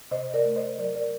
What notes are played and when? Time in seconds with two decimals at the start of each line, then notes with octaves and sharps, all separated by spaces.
0.11 C3 C5 D#5
0.34 A#4 D5
0.45 A3
0.56 C5 D#5
0.78 F#3 A#4 D5
0.95 A#4 D5